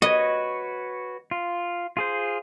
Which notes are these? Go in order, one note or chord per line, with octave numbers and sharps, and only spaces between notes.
F#4 B4 C#5 D#5
F4
F4 G#4 C5